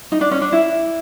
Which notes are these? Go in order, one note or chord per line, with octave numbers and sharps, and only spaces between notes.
D#4
D4
C#4
D4
E4